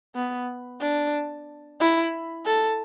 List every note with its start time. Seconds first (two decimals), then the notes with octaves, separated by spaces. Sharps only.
0.15 B3
0.81 D4
1.80 E4
2.46 A4